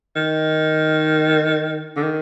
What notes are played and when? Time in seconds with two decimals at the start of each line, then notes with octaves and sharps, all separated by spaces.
0.16 D#3
1.96 D3
2.03 D#3